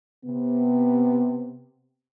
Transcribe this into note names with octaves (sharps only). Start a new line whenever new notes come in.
C3 B3